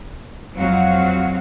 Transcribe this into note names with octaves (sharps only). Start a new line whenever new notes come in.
F2 F#3 G#3 C4 F#4 F5